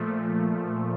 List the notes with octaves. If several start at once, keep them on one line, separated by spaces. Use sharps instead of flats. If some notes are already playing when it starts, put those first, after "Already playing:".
Already playing: A#2 F3 A3